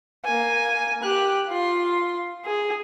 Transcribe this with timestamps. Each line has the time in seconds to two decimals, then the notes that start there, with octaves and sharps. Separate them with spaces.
0.25 A#3 G#5
1.03 G4 F#6
1.49 F4 C6
2.45 G#4